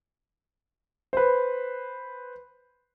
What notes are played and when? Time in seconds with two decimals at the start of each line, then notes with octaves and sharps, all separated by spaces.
1.13 B4 C5